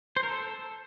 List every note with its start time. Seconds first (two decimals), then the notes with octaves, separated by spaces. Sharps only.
0.17 C5
0.23 A#4
0.30 A4